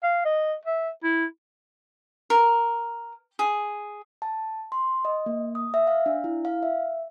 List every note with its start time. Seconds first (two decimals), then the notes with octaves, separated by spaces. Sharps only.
0.03 F5
0.25 D#5
0.65 E5
1.03 E4
2.30 A#4
3.39 G#4
4.22 A5
4.72 C6
5.05 D#5
5.26 A#3
5.55 D#6
5.74 E5
5.87 F5
6.06 D4
6.24 E4
6.45 F5
6.63 E5